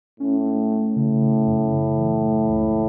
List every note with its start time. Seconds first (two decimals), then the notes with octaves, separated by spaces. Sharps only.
0.20 A2 C#4
0.45 A3
0.71 A3
0.96 A2 C#3
1.22 C#3
1.47 F#2
1.72 C#3
1.98 E3
2.23 A3
2.48 C#2